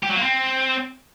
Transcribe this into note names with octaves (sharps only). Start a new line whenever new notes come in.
G4
F#3
A#3
C4